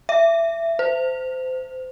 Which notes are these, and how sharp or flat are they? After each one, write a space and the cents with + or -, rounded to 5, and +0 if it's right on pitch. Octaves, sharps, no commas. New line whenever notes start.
E5 +20
C5 -25